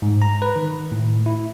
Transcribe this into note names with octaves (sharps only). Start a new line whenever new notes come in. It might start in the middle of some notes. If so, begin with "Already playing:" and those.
G#2
A#5
B4
D#3
A2
E4